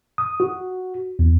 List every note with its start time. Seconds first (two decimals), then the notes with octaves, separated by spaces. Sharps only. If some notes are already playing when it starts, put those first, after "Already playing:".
0.18 D#6
0.40 F#4
1.19 E2